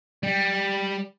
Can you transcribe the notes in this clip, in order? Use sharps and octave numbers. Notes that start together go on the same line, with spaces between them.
G3